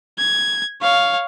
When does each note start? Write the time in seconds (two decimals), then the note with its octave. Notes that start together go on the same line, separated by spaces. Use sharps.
0.18 G#6
0.82 C#5 F5